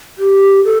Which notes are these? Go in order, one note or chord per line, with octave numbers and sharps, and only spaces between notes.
G4
A4